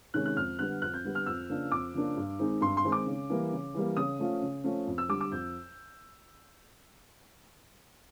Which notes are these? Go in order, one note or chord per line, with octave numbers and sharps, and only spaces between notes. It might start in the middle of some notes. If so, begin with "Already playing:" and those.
C3 D#3 G#3 C#4 F#6
F#6
F2 F6
D3 G3 B3 F#6
F2 F#6
G6
D3 G3 B3
F6
F2 E6
C#3 F3 A#3 D4
F2 D6
C#3 F3 A#3 D4
G2
D#3 G#3 C4 D#4
G2 C6
C6
D#3 G#3 C4 D#4
D6
C#3
E3 G3 A#3
C#3
E3 G3 A#3
C#3 D#6
F3 A3 C#4 F4
C#3
F3 A3 C#4 F4
F2
E6
D3 G3 D6
D6
F2 G6